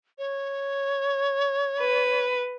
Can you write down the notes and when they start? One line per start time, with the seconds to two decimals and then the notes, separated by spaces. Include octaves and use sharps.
0.18 C#5
1.80 B4